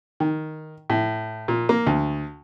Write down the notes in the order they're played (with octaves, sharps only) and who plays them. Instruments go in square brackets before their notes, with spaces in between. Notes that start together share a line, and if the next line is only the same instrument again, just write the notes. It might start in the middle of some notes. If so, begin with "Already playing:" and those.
[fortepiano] D#3
A2
A#2
A#3
D2